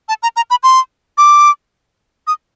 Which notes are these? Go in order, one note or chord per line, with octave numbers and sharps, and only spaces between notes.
A5
A#5
A#5
B5
C6
D6
D#6